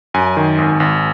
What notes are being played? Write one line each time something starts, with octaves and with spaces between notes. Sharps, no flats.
F#2 G#5
D#3
G#1
G#1